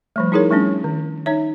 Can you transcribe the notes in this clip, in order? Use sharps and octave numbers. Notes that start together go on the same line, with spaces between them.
F3 G3 A3
D#4 E4 G#4 A#4 C#5
G3 A3 C#4 D4
D#3
D#4 C#5 E5